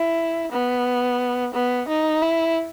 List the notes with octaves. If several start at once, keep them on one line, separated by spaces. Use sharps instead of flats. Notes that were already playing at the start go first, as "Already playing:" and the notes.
Already playing: E4
B3
B3
D#4
E4